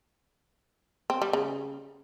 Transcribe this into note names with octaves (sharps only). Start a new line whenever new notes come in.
C4
G3
C#3